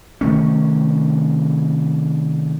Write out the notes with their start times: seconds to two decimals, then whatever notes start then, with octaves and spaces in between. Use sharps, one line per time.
0.21 C3 D#3 A3 C#4